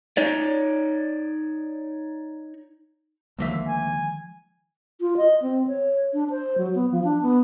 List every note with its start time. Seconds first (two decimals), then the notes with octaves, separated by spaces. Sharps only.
0.17 D#4 C#5 D5
3.39 D2 D#3 F3 G#3 A#3 E5
3.68 G#5
5.01 F4
5.17 D#5
5.42 C4
5.67 C#5
6.13 D4
6.30 C5
6.58 F#3
6.75 B3
6.91 F3
7.04 D4
7.22 B3